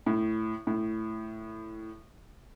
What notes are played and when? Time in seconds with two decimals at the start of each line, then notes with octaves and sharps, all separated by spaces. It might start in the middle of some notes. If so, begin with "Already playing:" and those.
0.06 A2
0.67 A2